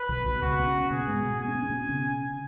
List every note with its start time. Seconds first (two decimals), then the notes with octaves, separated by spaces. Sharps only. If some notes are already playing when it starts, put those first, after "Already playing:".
Already playing: B4
0.09 B1 B2
0.25 B1 B2
0.41 C#2 C#3 F#4
0.59 B3
0.67 C#3 C#4
0.91 B2 B3 G#4
1.07 G#2 G#3
1.23 B2 B3
1.41 B3 G#5
1.48 C#4
1.55 B3
1.63 C#4
1.70 B2 B3
1.89 C#3 C#4